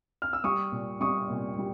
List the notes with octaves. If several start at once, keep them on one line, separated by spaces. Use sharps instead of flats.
F6
E6
G3 C#6 D#6
A#2
G3 C#6 D#6
A#2
G3